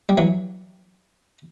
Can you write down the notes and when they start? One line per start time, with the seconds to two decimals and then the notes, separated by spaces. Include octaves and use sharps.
0.09 G3
0.18 E3 F#3